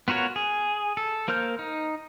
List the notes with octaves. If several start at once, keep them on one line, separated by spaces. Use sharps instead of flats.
B3 F4 F#4 A#4 C#5
G#4
A4
A#3 A#4 C5 F6 G6
D#4